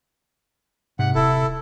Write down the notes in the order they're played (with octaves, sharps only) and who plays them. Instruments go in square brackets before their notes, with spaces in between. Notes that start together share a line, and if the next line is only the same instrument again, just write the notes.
[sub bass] G#2 [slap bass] C3 [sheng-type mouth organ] F#5
[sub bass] D1 [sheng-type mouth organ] E4 A4